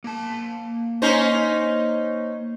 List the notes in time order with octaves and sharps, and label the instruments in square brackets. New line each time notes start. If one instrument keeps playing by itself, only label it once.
[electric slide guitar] A#3 A5
[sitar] C#4 D#4 C5